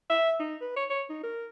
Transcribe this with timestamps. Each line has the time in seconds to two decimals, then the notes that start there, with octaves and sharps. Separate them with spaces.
0.10 E5
0.40 D#4
0.61 B4
0.77 C#5
0.90 C#5
1.10 D#4
1.23 A#4